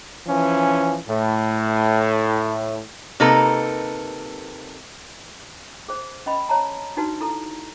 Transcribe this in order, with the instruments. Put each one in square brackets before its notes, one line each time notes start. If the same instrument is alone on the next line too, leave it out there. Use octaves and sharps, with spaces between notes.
[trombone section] E3 F3 C#4
A2
[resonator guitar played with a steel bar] C3 A#3 D#4 A4 B4 A#5
[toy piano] G#4 C5
C#4 D#5 B5
C#5 A5 A#5
D4 D#4 F#4 B4 A5
E4 A4 A#5